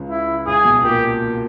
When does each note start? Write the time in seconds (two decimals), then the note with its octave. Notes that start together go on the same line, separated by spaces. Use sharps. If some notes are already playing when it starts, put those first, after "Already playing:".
Already playing: C#2 C#3
0.10 E4
0.47 C#2 C#3 G#4
0.65 B1 B2
0.83 A#2 A#3 G4